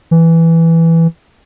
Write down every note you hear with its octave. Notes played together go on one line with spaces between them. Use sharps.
E3